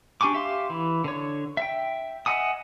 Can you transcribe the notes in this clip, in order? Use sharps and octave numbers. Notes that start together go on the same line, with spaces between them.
D4 G4 G#5 C#6 D6
G4 E5 F5 C6
E3
D3 C#5
E5 G5
D#5 E5 F#5 G#5 D#6